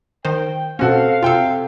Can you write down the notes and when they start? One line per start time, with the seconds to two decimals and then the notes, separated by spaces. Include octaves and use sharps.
0.25 D#3 C5 G5
0.79 B2 C4 C#4 F#4 A4 F5
1.23 C3 F4 A4 G5